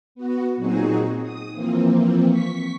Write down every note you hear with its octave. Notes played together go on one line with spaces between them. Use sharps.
B3 F#4
A#2 F#3 C4 D#4 F#4 G#4
D#6
E3 F3 A#3 C4
C#6 B6